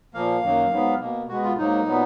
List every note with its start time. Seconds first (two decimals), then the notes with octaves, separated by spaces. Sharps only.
0.14 A#2 F3 A#3 F5
0.43 F#2 D#3 F#3 A#3
0.71 G#2 F#3 B3
1.00 B2 A#3
1.28 B2 G#3 B3 F#4
1.43 F4
1.57 G#2 F#3 A#3 D#4
1.86 A#2 F#3 B3